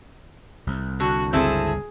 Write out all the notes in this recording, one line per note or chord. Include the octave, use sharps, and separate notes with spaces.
C2
D3 F#4
G1 C#2 G3 C4 E4 G#4 A4